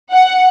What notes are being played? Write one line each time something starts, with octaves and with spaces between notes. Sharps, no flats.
F#5